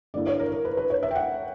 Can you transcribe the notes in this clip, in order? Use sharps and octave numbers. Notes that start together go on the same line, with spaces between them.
G2 D3 A#3 E4 D5
C#5
A#4
A#4
B4
B4
C#5
E5
G5
F#5